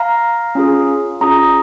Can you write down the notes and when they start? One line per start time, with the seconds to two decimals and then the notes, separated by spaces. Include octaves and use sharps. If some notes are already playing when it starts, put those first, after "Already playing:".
Already playing: F5 A#5
0.55 C#4 F4 G#4
1.21 C#4 F4 G#4 A#5 D#6